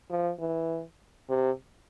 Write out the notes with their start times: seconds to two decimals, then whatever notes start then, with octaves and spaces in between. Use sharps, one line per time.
0.10 F3
0.40 E3
1.29 C3